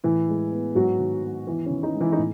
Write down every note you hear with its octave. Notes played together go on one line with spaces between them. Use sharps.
A2 E3 E4
G#3
B3
G#2 F#3 F#4
D#3
F#3
E2 E3 E4
D#3 C#4
D#4
G#3
E3 E4
D#4
A2